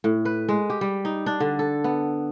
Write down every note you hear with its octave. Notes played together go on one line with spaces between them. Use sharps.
A2
B4
G#3
G4
G3
D#4
D4
D3
A4
B3